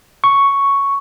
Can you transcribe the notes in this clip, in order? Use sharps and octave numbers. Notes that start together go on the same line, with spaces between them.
C#6